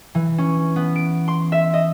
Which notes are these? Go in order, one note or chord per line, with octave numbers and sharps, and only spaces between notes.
E3
C#4
B3
D7
C6
E5
D#5